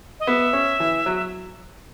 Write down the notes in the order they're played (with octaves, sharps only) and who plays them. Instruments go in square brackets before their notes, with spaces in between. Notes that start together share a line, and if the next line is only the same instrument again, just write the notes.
[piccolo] D#5
[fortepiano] B3 [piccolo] E5
[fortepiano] C#4
E3
F#3